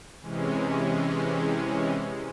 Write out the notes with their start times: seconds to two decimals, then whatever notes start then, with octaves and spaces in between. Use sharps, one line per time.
0.22 C3 E3 G#3 C#4